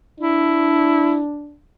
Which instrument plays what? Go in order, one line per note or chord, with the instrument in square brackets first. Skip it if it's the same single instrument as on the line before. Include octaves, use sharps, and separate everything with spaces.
[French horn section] D4 [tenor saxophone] E4